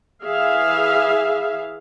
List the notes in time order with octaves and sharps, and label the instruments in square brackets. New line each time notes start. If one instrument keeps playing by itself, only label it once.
[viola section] E3 G#4 E5 F5